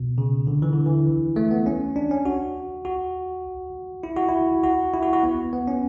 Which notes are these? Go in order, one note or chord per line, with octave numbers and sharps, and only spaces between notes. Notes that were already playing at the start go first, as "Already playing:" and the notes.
Already playing: B2
C#3
D3
E3
D3
E3
A3
B3
C#4
D4
C#4
F#4
F#4
E4
F#4
E4
F#4
E4
F#4
F#4
B3
B3
C#4